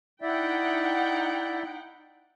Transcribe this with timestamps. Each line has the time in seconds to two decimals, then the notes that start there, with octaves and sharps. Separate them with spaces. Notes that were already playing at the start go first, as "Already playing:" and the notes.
0.22 D#4 E4 D5 E5 F#5 G5